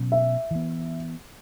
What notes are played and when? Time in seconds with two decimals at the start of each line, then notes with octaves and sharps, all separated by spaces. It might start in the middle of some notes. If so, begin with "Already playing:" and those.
Already playing: B2 F#3 C#4
0.12 E5
0.51 E3 B3